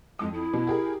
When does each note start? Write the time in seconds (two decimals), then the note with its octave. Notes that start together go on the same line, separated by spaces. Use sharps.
0.19 F2 G#3 D#6
0.34 E4
0.54 B2
0.67 G4 G#4 A#4